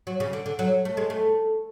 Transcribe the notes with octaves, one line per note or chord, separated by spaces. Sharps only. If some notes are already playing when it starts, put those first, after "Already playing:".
F#3
C#3
D3
D3
F#3
A3
G#3
A3